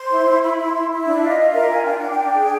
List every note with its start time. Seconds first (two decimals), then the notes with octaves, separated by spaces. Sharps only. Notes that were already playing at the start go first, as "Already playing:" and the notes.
Already playing: C5 C6
0.09 E4
0.25 E4
0.41 E4 B5
0.58 E4
0.64 C6
0.75 E4
0.90 E4
1.06 D4 E5
1.22 F4
1.28 D#5
1.39 F4
1.50 A#4 E5
1.70 F4 G#5
1.83 D4 G5
1.97 F#5
2.02 D4
2.10 G5
2.19 D4
2.35 G#4